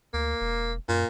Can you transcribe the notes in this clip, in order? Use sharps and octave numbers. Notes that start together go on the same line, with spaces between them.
D2 A#3
E1
F#2 A#2